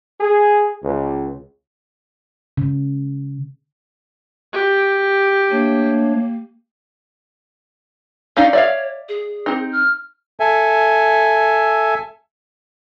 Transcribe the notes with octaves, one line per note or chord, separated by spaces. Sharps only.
G#4
C#2
C#3
G4
A3 A#3 D4 C#5
C#4 D#4 D5 F5
C#5 D5 E5 F5
G#4
C4 D#4
F6
A4 E5 G#5